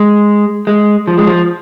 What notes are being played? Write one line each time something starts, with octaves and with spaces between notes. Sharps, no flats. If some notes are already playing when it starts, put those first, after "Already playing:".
Already playing: G#3
G#3
F3
G#3
F3